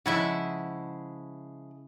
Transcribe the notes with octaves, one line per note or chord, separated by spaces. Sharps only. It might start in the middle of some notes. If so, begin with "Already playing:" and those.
C#3 F3 G#3 E4 E5 F#5